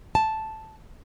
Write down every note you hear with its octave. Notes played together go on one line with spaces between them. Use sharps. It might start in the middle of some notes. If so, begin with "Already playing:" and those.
A5